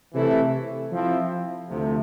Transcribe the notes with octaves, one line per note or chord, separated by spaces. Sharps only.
C3 E3 A3 E4 A4
F3 C4 E4
D2 C3 F3 A3